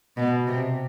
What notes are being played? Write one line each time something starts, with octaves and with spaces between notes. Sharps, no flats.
B2
C3